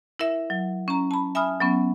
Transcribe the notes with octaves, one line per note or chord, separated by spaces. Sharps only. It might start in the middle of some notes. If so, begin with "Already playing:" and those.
E4 A#4 E5
F#3
C#4 A#5
A5 B5
E5 G#5 B5 D#6 F6
F#3 B3 C#4